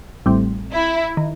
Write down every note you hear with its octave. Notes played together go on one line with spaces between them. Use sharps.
A1 A2 G3 C4
E4
D#3